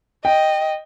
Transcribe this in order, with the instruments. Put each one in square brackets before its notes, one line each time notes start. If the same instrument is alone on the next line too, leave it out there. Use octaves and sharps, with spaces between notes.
[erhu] D#5 [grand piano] G5